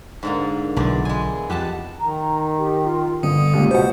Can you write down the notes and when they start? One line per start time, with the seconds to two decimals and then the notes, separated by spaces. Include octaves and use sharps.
0.23 G#2 D3 A#3
0.77 B1 E2 A#2 D3 D5
1.05 G#3 G#5
1.50 F2 G4 F#5 A5
1.99 D#3 A#5
2.58 G4
2.84 F4
3.23 G1 D3 D#6
3.53 C#2 A#2 G4
3.71 B2 C5 F#5